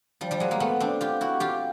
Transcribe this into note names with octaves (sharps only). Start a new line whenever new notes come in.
F3 G3
F3 G3
F#3 G#3
G#3 A#3
A3 B3
C4 D4
F4 G4
E4 F#4
F4 G4